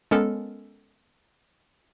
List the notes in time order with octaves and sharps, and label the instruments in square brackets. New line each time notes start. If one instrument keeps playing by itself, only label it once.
[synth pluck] G#3 B3 C#4 A4 A#4